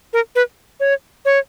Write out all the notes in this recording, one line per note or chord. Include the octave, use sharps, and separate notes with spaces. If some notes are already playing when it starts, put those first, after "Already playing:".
A#4
B4
C#5
C#5